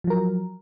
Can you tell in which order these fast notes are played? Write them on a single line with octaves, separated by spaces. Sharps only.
F3 F#3 A#4